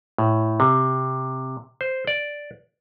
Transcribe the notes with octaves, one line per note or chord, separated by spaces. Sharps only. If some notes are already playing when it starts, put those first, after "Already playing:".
A2
C3
C5
D5